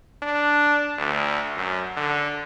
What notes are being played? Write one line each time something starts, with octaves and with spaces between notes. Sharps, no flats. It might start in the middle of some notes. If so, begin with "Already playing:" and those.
D4
D2
F#2
D3